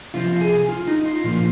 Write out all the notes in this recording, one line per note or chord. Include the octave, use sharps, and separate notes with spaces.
C3 F3 C4 F4
G#4
F4
D#4
F4
A#2 F3 A#3 F4